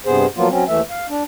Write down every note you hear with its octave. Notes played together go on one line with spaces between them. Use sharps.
G2 C3 B3 G#4 C5
F3 F#3 A#3 B3 F4
F#3 C4 C#4
D#2 E3 A3 E5
F5
D4